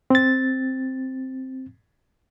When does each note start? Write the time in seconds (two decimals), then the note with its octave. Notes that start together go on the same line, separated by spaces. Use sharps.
0.10 C4 A6